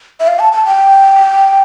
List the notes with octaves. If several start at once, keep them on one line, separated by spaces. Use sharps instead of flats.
E5
F5
A5
A5
G5